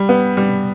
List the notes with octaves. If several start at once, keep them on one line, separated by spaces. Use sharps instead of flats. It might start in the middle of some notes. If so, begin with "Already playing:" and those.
Already playing: G3
B3
G3